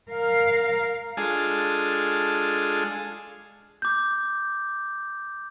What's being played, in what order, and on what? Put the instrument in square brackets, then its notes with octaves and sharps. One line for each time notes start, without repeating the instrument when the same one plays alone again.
[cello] A#4 F5
[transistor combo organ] G#3 D4 F4 G#4 A4
[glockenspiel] D6 G6